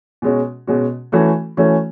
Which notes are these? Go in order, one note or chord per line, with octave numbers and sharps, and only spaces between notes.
B2 G#3 C#4 F#4
B2 G#3 C#4 F#4
E3 A3 C#4 F#4
E3 A3 C#4 F#4